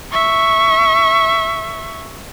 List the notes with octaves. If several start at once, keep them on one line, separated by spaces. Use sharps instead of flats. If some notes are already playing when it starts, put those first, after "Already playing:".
E5 C#6